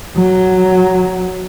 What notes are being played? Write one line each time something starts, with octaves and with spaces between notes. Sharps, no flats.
F#3